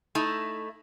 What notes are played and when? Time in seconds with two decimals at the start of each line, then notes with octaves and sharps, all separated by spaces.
0.15 A3 D#4 E4